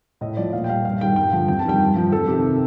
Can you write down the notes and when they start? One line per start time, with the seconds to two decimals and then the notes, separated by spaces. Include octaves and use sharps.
0.21 A2 D#5
0.37 F3 D5
0.53 A#2 F5
0.64 G5
0.69 G3 F5
0.85 G2 F5
1.01 D#3 G3 G5
1.16 G2 G5
1.33 D3 F3
1.48 F2 G5
1.59 A5
1.65 D#3 G3 G5
1.80 G2
1.96 F3
2.12 F2 A4
2.27 C3 D#3 G4